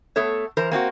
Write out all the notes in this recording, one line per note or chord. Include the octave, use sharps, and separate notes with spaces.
A3 B3 A4 C#5
E3 A#4 C5
A#3 C4 D4 F#4